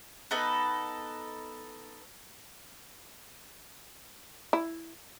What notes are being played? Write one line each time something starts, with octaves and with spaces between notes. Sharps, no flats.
B3 D#4 A4 B4
E4